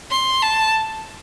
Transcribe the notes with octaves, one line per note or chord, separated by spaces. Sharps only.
C6
A5